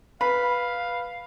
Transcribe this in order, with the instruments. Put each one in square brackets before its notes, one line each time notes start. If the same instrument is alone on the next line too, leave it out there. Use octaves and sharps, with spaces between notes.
[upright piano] B4 [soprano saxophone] F5 [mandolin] B5